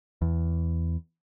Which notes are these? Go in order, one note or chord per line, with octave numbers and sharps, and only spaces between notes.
E2